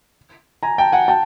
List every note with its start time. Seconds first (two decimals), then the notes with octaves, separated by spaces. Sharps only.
0.63 G#5 A#5
0.78 G5 A5
0.92 F#5 G#5
1.08 G5 A5